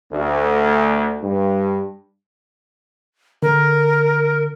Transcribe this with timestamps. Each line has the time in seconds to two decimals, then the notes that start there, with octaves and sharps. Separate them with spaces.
0.12 D2
1.23 G2
3.43 D3 A#4